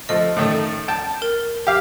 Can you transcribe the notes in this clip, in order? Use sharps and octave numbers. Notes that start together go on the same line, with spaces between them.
F3 A3 D#5
A2 D#3 A3
G5 A5
A#4
G4 F5